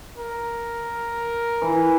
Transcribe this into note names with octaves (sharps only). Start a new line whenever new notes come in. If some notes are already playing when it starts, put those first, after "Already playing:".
A#4
E3